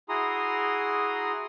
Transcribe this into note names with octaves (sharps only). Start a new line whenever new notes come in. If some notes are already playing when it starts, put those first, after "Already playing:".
E4 F#4 G#4 A#5 C6 D#6